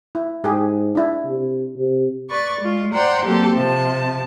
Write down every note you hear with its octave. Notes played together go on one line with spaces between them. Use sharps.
E4
G#2 G4 G#4
D4 E4
C3
C3
B4 D5 C#6 A6
G#3 F4
C5 D5 F#5 G5 A#5 C6
F#3 A#3 C4 G4 A4
C3 F3 A5